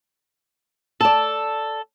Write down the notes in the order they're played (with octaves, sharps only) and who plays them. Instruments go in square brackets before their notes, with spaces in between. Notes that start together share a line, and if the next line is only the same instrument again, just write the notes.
[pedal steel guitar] A4 [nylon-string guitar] D5 A5